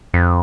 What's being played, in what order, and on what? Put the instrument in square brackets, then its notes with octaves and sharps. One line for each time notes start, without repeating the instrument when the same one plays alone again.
[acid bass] F2